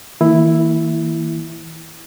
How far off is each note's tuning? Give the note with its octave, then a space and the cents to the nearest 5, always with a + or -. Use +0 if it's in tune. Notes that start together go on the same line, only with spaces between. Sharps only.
E3 -45 A#3 -20 E4 +0